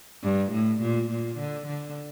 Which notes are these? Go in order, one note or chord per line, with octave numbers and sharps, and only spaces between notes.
G2
A2
A#2
A#2
D3
D3